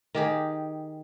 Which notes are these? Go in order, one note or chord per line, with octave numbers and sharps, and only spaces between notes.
D#3 G4 G#4